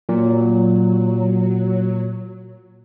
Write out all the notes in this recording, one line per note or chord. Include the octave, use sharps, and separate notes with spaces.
A#2 F#3